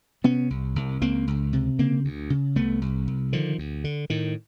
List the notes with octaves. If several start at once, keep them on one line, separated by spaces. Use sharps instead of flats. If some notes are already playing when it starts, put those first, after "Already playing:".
C3 B3 C#4
C2
C2
C#2 A#3 C4
C#2
C3
C#3 A#3 C4
D2
C#3
C2 A3 B3
C2
C2
D3 D#3 F3
D2
D3
A2 D#3